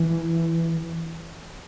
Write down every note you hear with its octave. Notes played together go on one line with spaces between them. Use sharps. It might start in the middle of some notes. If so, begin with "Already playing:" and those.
Already playing: E3